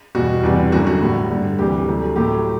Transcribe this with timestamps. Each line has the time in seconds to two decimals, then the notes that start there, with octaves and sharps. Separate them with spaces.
0.15 E2 B2 G3 F#4
0.43 E2 C3 E3 G3
0.72 F#2 D3 G3 F#4
0.87 F#4
1.01 A2 G3
1.30 G2 D3 G3
1.59 D2 C3 E3 G3 G4
1.87 D2 C3 F#3 A3
2.16 A2 F#3 A3 G4